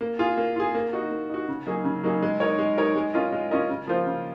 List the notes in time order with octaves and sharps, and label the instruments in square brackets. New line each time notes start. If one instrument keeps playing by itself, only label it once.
[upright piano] A#3
F4 G#4
A#3
F4 G#4
A#3
D#4 F#4
A#3
D#4 F#4
C#3
F#3 A#3 D#4 G#4
C#3
F#3 A#3 D#4 G#4
G#3
D#4 A#4 C#5
G#3
D#4 A#4 C#5
G#3
C#4 F4 A#4 D#5
G#3
C#4 F4 A#4 D#5
C#3
F3 A#3 F4 C5
C#3